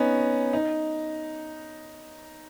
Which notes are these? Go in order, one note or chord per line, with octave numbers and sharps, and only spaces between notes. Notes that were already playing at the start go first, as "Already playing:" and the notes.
Already playing: B3 C#4 D#4
D#4